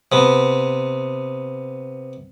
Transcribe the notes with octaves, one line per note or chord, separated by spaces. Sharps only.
C3 B3